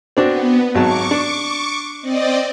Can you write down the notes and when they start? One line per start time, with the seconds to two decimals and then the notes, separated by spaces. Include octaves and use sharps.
0.17 B3 C4 D4 F#4
0.75 G#1 F#3 A5 C#6 D6
1.11 D4
2.01 C4 D5 D#5